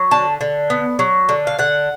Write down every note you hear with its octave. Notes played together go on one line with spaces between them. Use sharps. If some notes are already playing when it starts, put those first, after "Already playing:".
Already playing: F#3
D3 A5
D3
B3
F#3
D3
F5
D3 F#5